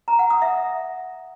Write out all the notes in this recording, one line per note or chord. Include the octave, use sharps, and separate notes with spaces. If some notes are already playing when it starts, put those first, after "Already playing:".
A#5
F#5
D#6
E5